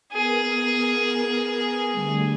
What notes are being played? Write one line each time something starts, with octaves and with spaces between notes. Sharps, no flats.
B3 G#4 A#4
D3 G3 A3